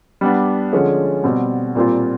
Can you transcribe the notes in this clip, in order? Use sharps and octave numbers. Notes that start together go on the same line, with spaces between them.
G3 B3 D4
D3 F3 G#3 C#4
B2 G3 C4
A#2 G3 C4 F4